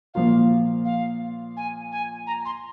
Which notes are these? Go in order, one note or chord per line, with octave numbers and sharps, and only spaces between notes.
A#2 F3 A#3 F4 F5
F5
G#5
G#5
A#5
C6